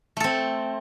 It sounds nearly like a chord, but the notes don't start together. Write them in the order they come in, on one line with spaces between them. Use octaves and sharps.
A3 A4 C4